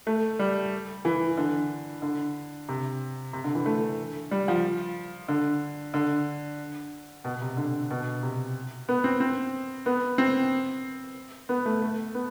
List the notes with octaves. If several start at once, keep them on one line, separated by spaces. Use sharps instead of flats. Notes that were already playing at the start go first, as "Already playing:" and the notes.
A3
G3
E3
D3
D3
C3
C3
D3
E3
A3
G3
F3
D3
D3
B2
C3
D3
B2
C3
B3
C4
C4
B3
C4
B3
A3
A3
B3